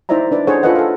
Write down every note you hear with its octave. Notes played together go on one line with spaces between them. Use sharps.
D#4 E4 C5 D5 E5 A#5
D4 B4 D5
D4 G#4 A4 C5 C#5 F#5
F4 A4 B4 C#5 D#5 F#5
A4 F5